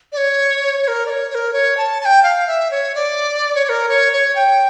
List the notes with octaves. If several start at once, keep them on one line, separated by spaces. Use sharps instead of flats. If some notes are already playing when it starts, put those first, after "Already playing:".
D5
C#5
C#5
A#4
D5
C#5
C#5
A#4
C#5
A5
A5
G5
F5
E5
C#5
D5
C#5
C#5
A#4
C#5
C#5
G5